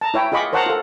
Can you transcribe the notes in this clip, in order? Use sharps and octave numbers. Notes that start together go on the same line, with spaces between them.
A5 A#5
E4 C#5 E5 G5
F4 G#4 D#5 B5 C#6 D6
A#4 C5 C#5 F#5 A5 A#5
F4 A4